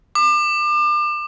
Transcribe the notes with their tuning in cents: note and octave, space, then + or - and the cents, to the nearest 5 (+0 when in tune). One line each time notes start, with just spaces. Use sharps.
D6 +35